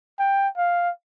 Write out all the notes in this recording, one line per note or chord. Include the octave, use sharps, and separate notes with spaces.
G5
F5